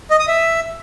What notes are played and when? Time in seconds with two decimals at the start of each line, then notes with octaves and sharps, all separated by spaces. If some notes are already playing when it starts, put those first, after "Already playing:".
0.11 D#5
0.19 D#6
0.28 E5